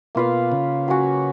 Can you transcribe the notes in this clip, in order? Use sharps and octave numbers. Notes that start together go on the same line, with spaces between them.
B2 A#3 F4 B4 F5
C#3
F#3 C#4 F#4